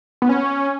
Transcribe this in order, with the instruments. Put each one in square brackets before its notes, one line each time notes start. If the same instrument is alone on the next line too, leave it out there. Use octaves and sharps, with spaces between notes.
[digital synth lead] B3
C#4